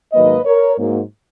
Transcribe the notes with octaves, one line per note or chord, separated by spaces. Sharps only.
G#2 D#3 F#3 A#3 B4 D#5
A#4 C#5
G#2 F#3 A#3